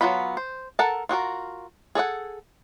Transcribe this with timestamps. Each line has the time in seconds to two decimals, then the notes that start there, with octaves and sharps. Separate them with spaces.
0.01 F#3 B3 D#4 F4 B5
0.37 C5
0.79 A4 A#4 F#5 A5
1.09 F4 F#4 G#4 A#4
1.95 G#4 A4 D#5 F#5